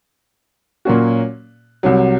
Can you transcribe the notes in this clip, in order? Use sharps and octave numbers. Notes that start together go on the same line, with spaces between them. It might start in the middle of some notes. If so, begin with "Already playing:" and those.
A#2 F#3 A#3 C#4 F#4
C2 C3 F#3